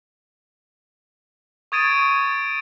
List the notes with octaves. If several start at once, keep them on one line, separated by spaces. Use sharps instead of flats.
C#6 D#6 G#6 A6 D7 D#7